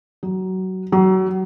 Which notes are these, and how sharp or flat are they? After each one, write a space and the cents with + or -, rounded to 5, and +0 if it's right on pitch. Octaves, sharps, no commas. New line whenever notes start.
F#3 +20
F#3 +30